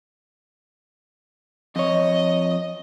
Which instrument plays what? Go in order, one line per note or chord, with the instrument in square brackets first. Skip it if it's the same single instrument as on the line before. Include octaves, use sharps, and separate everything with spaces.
[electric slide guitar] F2 C#5 [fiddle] D#5